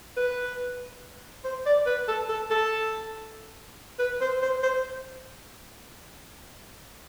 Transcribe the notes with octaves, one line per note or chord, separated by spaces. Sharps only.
B4
C5
D5
B4
A4
A4
A4
B4
C5
C5
C5